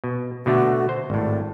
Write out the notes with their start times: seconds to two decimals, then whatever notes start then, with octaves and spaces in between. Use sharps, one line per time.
0.04 B2
0.46 B2 D3 A3 F#4
0.89 C5
1.10 G#1 A2 D5